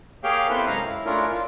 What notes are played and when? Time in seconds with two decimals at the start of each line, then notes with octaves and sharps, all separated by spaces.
0.24 A#3 G4 G#4 C#5 F5 G5
0.49 B3 C4 E4 A4 B4 C5
0.67 F#2 C3 G#3 C#4 F5 A#5
0.85 E4
1.06 A3 C#4 D4 E4 F4 A#4
1.34 F4